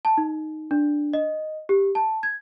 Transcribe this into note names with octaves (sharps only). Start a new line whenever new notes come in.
A5
D#4
D4
D#5
G4
A5
G#6